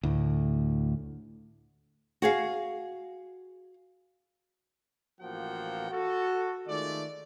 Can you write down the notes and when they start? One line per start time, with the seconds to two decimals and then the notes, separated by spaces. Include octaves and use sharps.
0.03 D2 A2
2.22 F#4 G#4 F5
5.21 A1 F3 A#3 F#4 F#5 G5
5.91 F#4 A4
6.67 D#3 G#3 A3 F4 D5